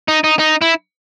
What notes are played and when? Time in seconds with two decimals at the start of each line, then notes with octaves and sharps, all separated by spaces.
0.08 D#4
0.24 D#4
0.39 D#4
0.61 E4